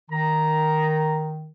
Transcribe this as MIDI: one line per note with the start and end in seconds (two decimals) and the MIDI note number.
0.11 1.49 51
0.11 1.28 82